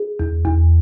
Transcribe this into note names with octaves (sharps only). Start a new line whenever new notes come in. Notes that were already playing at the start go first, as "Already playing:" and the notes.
Already playing: G#4
E2
E2